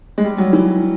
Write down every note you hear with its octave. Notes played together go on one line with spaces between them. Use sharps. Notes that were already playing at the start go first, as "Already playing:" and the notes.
G#3
G3
F#3
E3